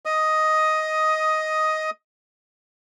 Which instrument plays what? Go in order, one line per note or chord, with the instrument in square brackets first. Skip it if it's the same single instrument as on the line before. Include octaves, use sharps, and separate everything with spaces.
[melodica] D#5 D#6